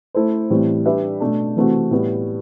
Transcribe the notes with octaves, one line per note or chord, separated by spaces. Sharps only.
A3 E4 A4 C5
A2 E3 G3 C4
G3 D4 G4 B4 E5
B2 A3 D4
C3 E3 A3 C4 F#4
A2 G3 B3